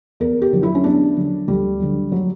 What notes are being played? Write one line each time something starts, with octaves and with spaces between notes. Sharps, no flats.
E2 A#4
G4
D3 F#3
E4
C#4
E2 D4
D3 F#3
D2 G3
D3 F#3
F#3